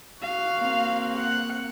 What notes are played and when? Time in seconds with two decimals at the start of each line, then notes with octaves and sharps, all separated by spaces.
0.22 F#4 F5
0.57 A#3 C4
1.17 F#5